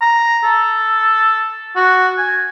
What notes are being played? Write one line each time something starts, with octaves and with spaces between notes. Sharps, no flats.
A#5
A4
F#4
G#5